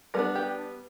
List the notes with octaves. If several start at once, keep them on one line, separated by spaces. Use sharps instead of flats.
G3 B3 D4 A#4
G4